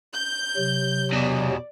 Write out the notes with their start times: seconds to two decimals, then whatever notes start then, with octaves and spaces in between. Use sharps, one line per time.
0.14 G6
0.56 C3 F#3
1.13 E2 B2 D5